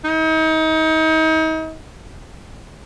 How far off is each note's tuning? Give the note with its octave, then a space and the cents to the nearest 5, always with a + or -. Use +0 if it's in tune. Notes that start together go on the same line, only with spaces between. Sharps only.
D#4 +35